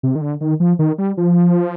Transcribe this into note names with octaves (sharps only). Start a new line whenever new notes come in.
C3
D#3
D3
D#3
F3
D#3
G3
F3